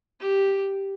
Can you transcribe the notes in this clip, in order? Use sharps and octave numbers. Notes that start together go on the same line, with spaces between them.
G4